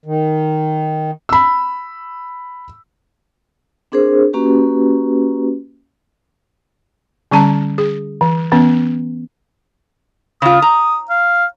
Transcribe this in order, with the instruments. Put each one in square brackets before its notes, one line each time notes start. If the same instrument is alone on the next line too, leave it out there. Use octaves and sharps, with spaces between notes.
[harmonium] D#3
[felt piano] B5 E6
[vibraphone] C4 D4 G#4 A#4 C5
A#3 C#4 F#4 G4 B4
[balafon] D3 G3 C#4 A5 A#5
G#4
E3
E3 B3 C#4
[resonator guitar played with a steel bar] C#3 F4 [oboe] D#6
[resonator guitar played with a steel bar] A#5
[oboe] F5